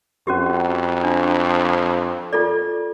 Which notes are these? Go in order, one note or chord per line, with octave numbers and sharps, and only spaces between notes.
F2 C#4 F#4 G4
D4
F4 A4 D5